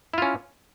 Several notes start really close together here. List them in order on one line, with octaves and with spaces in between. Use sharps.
E4 F4 C#4